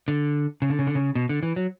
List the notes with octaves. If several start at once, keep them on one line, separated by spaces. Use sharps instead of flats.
D3
C#3
D3
C#3
D3
C#3
B2
D3
E3
F#3